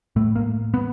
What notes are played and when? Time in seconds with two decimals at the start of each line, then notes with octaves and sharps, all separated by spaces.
0.16 A2 A3
0.36 A#3
0.74 B3